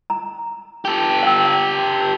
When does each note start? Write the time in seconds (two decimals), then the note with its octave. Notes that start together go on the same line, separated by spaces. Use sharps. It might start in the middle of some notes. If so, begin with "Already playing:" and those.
0.10 A#5
0.85 G4 A4
1.23 F5 G5 E6